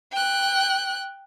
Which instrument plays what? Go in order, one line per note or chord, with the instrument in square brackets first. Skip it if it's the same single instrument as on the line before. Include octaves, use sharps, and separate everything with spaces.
[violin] G5 F#6